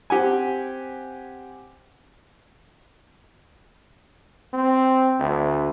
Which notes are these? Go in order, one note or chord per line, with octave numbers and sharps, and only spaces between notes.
C4 G4 F#5 G#5
C4
D2